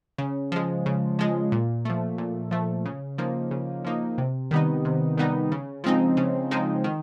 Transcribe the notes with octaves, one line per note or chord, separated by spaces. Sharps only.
C#3
F3 G#3
C#3
F3 G#3
A#2
F3 A3
A#2
F3 A3
C#3
F3 A#3 D#4
C#3
F3 A#3 D#4
C3
D#3 G3 B3 D#4
C3
D#3 G3 B3 D#4
C#3
F3 G#3 C4 D#4
C#3
F3 G#3 C4 D#4
D#3